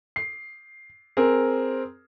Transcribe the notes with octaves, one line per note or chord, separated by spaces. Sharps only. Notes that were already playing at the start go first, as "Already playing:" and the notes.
C7
C4 G#4 A#4